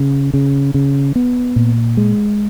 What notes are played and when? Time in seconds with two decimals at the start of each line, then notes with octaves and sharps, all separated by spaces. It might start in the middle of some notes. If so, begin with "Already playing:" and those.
Already playing: C#3
0.34 C#3
0.74 C#3
1.16 B3
1.56 A#2
1.97 G#3